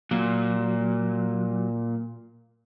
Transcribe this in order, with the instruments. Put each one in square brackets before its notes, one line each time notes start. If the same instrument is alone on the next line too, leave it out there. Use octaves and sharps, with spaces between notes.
[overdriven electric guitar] A#2 [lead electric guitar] F#3